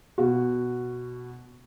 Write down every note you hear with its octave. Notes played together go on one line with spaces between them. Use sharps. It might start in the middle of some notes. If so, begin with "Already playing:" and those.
B2 F#4